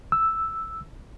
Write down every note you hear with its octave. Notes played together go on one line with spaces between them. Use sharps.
E6